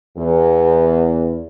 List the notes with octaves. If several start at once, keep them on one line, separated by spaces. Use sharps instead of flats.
E2